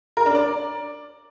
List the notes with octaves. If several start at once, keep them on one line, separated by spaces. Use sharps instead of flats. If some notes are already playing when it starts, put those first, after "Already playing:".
A#4
D4
D5